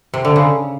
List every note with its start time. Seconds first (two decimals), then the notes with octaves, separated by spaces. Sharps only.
0.14 C3
0.25 D3
0.36 C#3